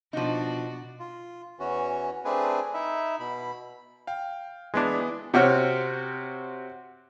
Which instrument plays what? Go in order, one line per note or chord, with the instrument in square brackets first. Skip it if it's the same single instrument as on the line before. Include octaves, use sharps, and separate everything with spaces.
[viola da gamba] B2 D4 F#4 [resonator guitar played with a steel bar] F3 D#4
[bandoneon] F4
E2 E3 C#4 F#4
A3 C4 D4 G#4 B4 G#5
D#4 E4 E5
B2 B5
[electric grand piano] F5 G5
[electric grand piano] E3 B3 E4 [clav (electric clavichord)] G#3 D4
[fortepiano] C3 C4 F#4 C#5 F6